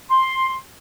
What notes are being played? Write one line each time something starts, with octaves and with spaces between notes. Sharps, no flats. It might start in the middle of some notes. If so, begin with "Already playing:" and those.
C6